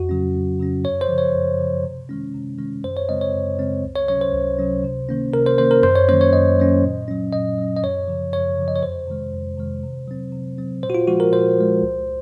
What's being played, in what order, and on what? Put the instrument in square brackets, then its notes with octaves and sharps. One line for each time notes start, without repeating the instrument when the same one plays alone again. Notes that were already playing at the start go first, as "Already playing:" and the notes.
Already playing: [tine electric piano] F2 F#4
C#3 F#3 C#4
F2
C#3 F#3 C#4
F#2 C#5
C5
C#3 F3
C#5
F#2
C#3 F3
C3
D#3 G#3 C#4
C3
D#3 G#3 C#4
F#2 C5
C#5
C#3 G#3 C4 D#5
C#5
F#2
C#3 G#3 C4
C#2
C#5
C3 F#3 C#4 C#5
C5
C#2
C3 F#3 C#4
C3
D#3 A#3 C#4
C3 A#4
C5
D#3 A#3 C#4 C5
A#4
F#2 C5
C#5
D#3 F#3 A#3 C#4 C5
C#5
F#2 D#5
D#3 F#3 A#3 C#4
A#2
F#3 C#4
A#2 D#5
F#3 C#4
D#5
F#2 C#5
C#3 F3
F#2 C#5
C#3 F3
D#5
C#5
F2 C5
C3 D#3 G#3
F2
C3 D#3 G#3
C3
F#3 C4
C3
F#3 C4
A#2 C5
F#4
F4
F3 G#3 F#4
A#4
A#2 C5
F3 G#3
C#2